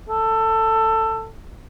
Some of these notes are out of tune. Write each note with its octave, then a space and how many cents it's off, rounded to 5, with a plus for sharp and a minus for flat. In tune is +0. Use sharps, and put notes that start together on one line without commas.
A4 +15